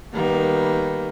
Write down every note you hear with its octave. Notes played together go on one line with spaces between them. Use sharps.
D#3 G3 A#3 B3